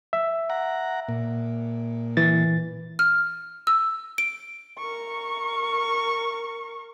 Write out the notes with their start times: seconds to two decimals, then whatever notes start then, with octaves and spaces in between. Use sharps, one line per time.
0.13 E5
0.50 F#5 A#5
1.09 A#2
2.17 E3 A6
2.99 F6
3.67 E6
4.18 D7
4.78 A#4 C#6